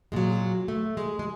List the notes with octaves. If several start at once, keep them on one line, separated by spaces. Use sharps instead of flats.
A#2 F#3 G#3
A3
G#3
G#3